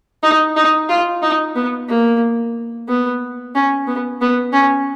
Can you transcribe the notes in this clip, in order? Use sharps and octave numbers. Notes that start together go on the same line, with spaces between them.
D#4
D#4
F4
D#4
B3
A#3
B3
C#4
B3
B3
C#4